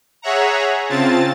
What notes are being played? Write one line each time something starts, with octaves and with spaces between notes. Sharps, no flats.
G#4 C#5 E5 F#5 A#5
C#3 C4 F4 A5 A6